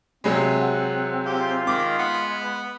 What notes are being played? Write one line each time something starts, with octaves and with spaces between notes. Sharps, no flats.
C3 F#3 G#3 C4
F#5
F4 G4
D#3 G#3 D6
B3
B4